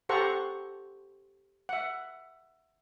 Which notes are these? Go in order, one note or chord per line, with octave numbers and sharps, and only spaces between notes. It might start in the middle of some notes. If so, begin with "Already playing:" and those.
G4 A4 C5 F#5 A#5 C#6
E5 F#5